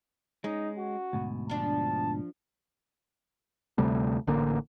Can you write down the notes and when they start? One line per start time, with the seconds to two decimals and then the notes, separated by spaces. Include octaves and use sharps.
0.44 G#3 C#4 D#4
0.78 F#4
1.13 D2 G#2 B2
1.50 F3 D4 A5
3.78 D2 C3 G3 A3
4.27 A1 D3 A#3